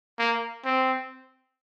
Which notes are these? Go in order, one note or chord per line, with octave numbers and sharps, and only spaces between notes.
A#3
C4